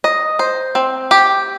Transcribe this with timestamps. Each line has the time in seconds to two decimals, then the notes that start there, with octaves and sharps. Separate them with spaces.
0.04 D#5
0.39 C5
0.75 C4
1.11 G4